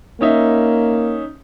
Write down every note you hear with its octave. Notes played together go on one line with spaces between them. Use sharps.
A#3 C#4 D#4 E5